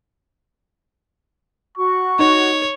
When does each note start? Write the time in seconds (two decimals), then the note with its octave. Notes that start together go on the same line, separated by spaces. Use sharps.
1.78 F#4 C#6
2.19 D#4 C#5